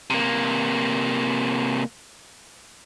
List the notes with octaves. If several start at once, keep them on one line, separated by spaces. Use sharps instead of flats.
C3 A#3